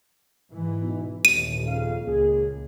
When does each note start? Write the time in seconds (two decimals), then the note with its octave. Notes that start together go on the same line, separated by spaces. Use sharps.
0.52 G#2 E3
0.81 B2 D#4
1.25 A1 D#2 A#2 D#7
1.67 F2 C#3 F5
2.05 C#2 A#3 G#4